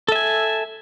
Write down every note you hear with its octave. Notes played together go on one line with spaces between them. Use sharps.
A4 E5 G#5